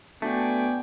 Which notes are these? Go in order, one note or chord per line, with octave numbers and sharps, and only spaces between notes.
A3 B3 D4 F#4 D5 G5 G#5